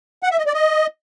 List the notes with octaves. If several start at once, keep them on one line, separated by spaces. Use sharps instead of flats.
F#5
E5
D#5
D5
D#5